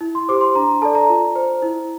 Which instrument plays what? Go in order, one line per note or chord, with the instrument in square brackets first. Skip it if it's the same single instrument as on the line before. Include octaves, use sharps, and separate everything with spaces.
[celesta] E4
C6
G4 C5 D6
C6
D4 A#5
A4 D5 A5
A#5
F4
C5
E4